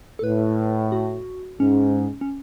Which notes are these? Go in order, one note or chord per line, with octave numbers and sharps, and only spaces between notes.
A4
A2 B4
F#4
G#2 C#4
C#4